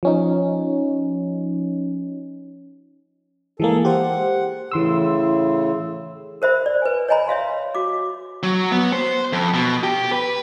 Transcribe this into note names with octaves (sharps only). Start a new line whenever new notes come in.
F3 C#4 D#4
E3 G#3 A#3 G#4 A4
G4 C5 F#5
A2 C#3 E3 C6 E6
A#4 C5 E5 B5
D5
B4 G#5
C#5 D#5 G#5 A#5 B5
C#5 E5 F5 C6
F#4 D6
F#3
B3
C5
F2
B2
G4
B4